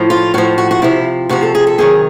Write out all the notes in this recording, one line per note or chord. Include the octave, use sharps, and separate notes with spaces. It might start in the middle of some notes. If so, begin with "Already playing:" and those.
Already playing: A2 F3
F4
A2 F3 F#4
F#4
F#4
C3 F3 E4
C3 F3 F#4
A4
G#4
A4
C3 D#3 F#3 G#4